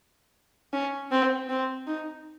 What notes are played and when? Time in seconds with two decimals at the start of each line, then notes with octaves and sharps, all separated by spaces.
0.73 C#4
1.11 C4
1.49 C4
1.87 D#4